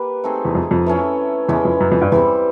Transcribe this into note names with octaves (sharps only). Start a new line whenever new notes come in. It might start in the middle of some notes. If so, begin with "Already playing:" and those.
Already playing: A#3 G4 B4
A3 C4 D#4 G#4
E2
F2
F2
E3 A3 C#4 E4
E2 E3 G#3 C#4 E4
F2
F#2
F2
G2
E2 E3 G3 C4